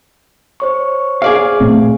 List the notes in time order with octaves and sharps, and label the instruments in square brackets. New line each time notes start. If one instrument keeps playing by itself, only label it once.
[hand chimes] C5 C#5 C#6
[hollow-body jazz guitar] G#4 D5 F5
[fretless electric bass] A#2 A3 C4